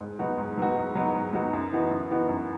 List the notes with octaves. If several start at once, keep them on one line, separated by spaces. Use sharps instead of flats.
G#2
F#3 B3 D#4 F#4
G#2
F#3 B3 D#4 F#4
G#2
F#3 B3 D#4 F#4
G#2
F#3 B3 D#4 F#4
F#2
E3 B3 D#4 F#4
F#2
E3 B3 D#4 F#4
F#2